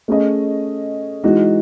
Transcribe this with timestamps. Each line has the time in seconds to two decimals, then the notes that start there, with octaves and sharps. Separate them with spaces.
0.08 A3 C#4 G#4 D#5
1.24 E3 G#3 D#4 F#4